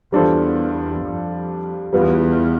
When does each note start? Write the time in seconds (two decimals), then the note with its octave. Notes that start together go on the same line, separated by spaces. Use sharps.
0.12 E2 G3 D4 F4 A4 C5
1.03 F2
1.93 E2 G3 B3 F4